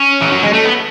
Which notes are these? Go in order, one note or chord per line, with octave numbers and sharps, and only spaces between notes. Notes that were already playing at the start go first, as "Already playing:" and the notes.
Already playing: C#4
E3
F#3
G#3
A3
B3